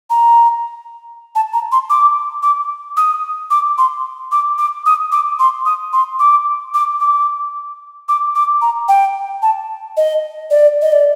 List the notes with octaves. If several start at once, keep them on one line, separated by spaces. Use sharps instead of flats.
A#5
A5
A#5
C6
D6
D6
D#6
D6
C6
D6
D6
D#6
D6
C6
D#6
C6
D6
D6
D6
D6
D6
A#5
G5
A5
D#5
D5
D#5
D5